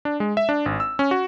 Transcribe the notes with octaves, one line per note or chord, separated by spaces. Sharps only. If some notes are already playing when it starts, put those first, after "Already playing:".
D4
G#3
E5
D4
G#1
E6
C#4
F#4